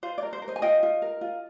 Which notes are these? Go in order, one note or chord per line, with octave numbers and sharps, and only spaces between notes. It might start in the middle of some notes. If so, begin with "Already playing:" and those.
F4 C5
D5
A#4
C5
A#4
C5 D#5
G#5
F4 D#5 G5
F4
A#4
F4